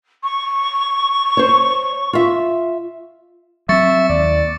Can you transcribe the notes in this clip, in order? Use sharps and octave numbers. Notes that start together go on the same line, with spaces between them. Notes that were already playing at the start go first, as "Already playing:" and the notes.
C#6
C5 C#5
F4 E5
F#3 C4 E5 C#6 A6 C#7
D#2 D5